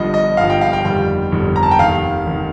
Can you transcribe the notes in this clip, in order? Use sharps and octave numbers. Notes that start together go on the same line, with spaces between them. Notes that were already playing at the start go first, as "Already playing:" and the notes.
Already playing: G1 G2 F3 D#5
D#5
G1 G2 F3 F5
G5
F5
G5
G1 F2 D#3 G3 G5
G1 F2 D#3 G3
A#5
A5
G5
F1 D#2 D#3 F5
F1 D#3